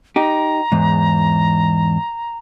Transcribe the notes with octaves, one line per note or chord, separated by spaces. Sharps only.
D#4 G4 A#5
E2 G#2